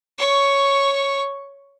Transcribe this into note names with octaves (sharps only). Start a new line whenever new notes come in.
C#5 C#6